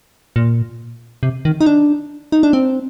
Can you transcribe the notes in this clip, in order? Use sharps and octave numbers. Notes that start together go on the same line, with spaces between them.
A#2
C3
D#3
D#4
D4
D#4
D4
C4